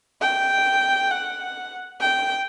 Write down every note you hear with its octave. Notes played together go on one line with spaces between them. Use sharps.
G5
F#5
G5